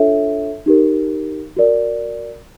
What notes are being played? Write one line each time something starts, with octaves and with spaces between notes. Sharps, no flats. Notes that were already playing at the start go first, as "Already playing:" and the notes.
Already playing: D4 F4 A4 C#5 E5
D#4 G4 A#4
F#4 A#4 D5